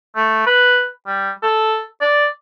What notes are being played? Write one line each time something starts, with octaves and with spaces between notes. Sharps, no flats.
A3
B4
G3
A4
D5